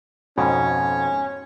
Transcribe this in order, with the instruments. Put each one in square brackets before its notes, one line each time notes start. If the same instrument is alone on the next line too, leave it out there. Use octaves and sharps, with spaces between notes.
[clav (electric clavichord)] F2 G#2 B2 [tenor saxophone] C#4